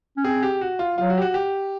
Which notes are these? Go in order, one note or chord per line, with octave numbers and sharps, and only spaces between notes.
C#4
C4 G#4
G4
F#4
F4
F#3 F4
F#4
G4
F#4
G4